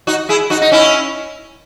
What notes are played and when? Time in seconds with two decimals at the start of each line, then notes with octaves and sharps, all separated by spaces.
0.07 D#4 F#4
0.29 E4 G#4
0.50 D#4 F#4
0.62 D#4
0.72 C#4 E4